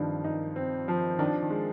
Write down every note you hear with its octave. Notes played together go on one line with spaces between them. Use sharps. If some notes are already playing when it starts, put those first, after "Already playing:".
Already playing: G2 D#3 F3 C4
D#4
C4
F3
D#3 D4
D#3
G#3